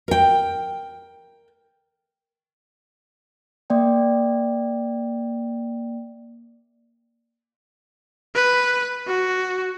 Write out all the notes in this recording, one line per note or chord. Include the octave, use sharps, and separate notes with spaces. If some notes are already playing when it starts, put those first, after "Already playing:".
A#4 G5
A#3 D5 G5
B4
F#4